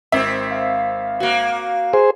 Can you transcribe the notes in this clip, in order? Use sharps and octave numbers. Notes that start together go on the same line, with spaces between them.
G#1 C4 E5
F5
A#3 F#4
G#4 C5